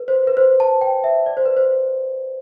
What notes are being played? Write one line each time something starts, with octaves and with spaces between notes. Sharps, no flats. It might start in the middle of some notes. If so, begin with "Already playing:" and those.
Already playing: B4
C5
B4
C5
A5
G5
E5
D5
C5
B4
C5